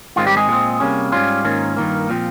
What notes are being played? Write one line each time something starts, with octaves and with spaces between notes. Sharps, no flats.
G#2 D#3 G#3 C4 F4
G3 G4
G#3 G#4
A#2 G#3 C4
C3 G3 A#3 C#4
G#2 G3 C#4 F4
G#2 D#3 A#3 C#4
G2 D#3 A#3
A#2 F3 C4